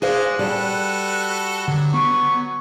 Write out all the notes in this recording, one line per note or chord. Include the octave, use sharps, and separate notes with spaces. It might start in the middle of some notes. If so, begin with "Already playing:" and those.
G#3 D4 G#4 C5 F5 F#6
G3 F#4 A4 B4
D3 F#3
B3 C#6